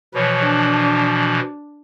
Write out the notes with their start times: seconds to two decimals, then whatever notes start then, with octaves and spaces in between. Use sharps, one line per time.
0.14 B2 E3 F3 B4 C#5
0.44 D4